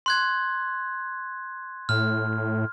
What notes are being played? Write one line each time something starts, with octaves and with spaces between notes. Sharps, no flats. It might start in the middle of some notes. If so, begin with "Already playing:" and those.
C6 F#6 G#6
A2 F6